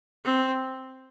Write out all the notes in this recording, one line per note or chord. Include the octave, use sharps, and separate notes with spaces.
C4